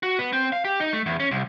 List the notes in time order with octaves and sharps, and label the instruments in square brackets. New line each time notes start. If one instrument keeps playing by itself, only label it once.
[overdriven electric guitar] F#4
B3
C4
F5
G4
D#4
A3
E2
C#4
C2